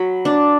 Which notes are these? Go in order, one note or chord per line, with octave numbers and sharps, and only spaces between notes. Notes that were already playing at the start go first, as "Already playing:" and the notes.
Already playing: F#3 B5
D4